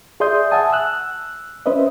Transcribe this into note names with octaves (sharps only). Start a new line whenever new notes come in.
G#4 D5 E5 C6 D#6 G6
E5 F#5 G#5 A5 D#6
E6 F#6
C#4 B4 C5 D#5 E5